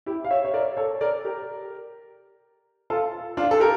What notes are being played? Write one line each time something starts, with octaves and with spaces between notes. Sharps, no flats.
E4 G4
F5
C#5 E5
C#5
A#4 D5
A4 C#5
A#4 D5
G4 A#4
F4 A4
D4 F4
A4
G4 A#4